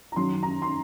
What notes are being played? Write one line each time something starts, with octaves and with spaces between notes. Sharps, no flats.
A#5
F#2 D#3 F#3 C6
A#5
C6